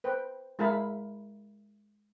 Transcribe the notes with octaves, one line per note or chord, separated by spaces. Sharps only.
B4 C5 G5
G#3 E4 A#4 F5 A5 B5